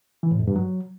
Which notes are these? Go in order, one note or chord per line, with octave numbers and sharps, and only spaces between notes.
E3
A2
F2
G2
F#3